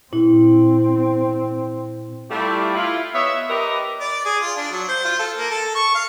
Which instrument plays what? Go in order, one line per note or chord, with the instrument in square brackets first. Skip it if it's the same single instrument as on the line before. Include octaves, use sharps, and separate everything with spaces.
[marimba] A#2 E4 [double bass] C4
[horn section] G3 A3 E4 F4 G4
E4 F4
B3 C#5 D#5 E5
G4 A#4 B4 D5 D#5
[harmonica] D5
G#4
F4
D4
F#3
C5
F4
A4
A#3
A4
C#6
F5